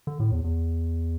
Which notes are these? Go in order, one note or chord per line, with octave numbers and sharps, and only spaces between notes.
D3
A2
E2
E2